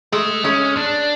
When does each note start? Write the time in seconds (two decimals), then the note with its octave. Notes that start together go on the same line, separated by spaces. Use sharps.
0.12 G#3 A3
0.44 G#3 C#4
0.77 D4